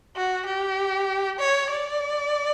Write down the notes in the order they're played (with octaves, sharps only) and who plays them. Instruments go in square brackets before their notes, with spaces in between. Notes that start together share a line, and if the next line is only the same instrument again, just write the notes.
[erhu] F#4
G4
C#5
D5